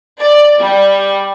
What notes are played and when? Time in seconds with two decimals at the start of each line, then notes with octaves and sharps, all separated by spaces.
0.20 D5
0.59 G3